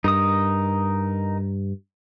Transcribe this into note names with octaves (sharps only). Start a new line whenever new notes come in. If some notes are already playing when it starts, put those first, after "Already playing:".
G2 D#4 A#4 D#6